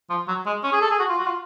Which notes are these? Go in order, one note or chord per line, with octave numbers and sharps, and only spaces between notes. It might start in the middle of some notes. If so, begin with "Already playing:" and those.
F3
F#3
G#3
C#4
G#4
A4
G#4
F#4
F4
F#4
F4